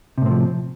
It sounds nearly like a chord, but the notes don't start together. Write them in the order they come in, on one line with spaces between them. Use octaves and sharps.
C3 A2 C4 F3